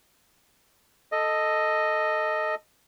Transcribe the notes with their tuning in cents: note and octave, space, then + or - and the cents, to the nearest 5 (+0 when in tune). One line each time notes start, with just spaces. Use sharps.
A4 +0 D#5 +0